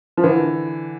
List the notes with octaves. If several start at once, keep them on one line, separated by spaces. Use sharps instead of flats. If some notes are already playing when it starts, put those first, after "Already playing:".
F3
D3 E3